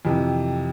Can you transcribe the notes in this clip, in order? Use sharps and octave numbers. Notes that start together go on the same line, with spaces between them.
F2 C3 E3